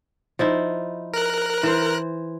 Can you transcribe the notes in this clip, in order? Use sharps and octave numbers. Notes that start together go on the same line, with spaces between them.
F3 D#4 E4
A#4 F#6
E3 C5